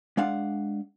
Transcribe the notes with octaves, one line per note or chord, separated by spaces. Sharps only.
G#3 D4 F5 F#5